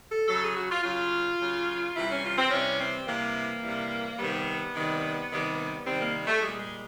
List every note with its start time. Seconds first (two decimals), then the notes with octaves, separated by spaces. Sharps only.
0.11 A4
0.28 C#3 F#3 A4
0.43 G#4
0.57 F#4
0.70 F4
0.84 C#3 F#3 F4
1.41 C#3 F#3
1.95 C3 E3 G3 E4
2.09 C#4
2.24 F4
2.38 C4
2.51 C3 E3 G3 C#4
2.79 C4
3.07 C3 E3 G3 A#3
3.62 C3 E3 G3
4.18 C3 D#3 G3 B3
4.74 C3 D#3 G3
5.31 C3 D#3 G3
5.86 C3 D#3 G3 C4
5.99 A#3
6.27 A3
6.41 A#2 G3 G#3
6.60 G#3